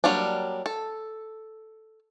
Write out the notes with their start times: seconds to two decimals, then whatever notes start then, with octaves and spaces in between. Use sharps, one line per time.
0.04 F#3 G3 A#3 D4
0.66 A4